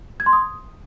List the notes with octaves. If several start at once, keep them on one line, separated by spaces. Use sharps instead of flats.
G#6
C6
D#6